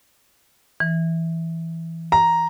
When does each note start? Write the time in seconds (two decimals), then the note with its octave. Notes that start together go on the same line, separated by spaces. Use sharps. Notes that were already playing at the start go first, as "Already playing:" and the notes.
0.80 E3
2.12 A#5